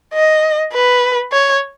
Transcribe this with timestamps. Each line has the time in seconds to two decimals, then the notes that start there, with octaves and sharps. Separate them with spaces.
0.14 D#5
0.73 B4
1.32 C#5